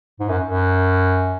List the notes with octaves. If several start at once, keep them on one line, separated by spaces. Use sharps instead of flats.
G#2
F#2
F#2